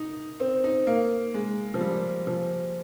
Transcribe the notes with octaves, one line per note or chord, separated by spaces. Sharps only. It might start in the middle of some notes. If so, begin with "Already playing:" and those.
Already playing: D#4
C4
D#4
A#3
G#3
F3
G3
F3